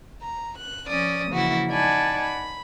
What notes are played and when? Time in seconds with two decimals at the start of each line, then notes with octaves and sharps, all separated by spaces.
0.21 A#5
0.58 F#6
0.87 F3 C#4 D5 D#6
1.29 C#3 E3 F3 A#3 E4 F#4
1.70 D#4 D5 F#5 G#5 A5 B5
2.21 B5